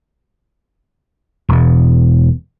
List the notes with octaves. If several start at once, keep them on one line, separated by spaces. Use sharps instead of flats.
E1 E2